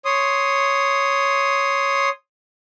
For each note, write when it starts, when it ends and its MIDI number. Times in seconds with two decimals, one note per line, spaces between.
0.05 2.09 73
0.05 2.09 84
0.05 2.09 87